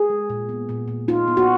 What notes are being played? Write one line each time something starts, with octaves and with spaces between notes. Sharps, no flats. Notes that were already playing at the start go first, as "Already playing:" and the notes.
Already playing: G#4
G#3
A#2
B3
A#2
A#2
D#4 F4
B3
F#4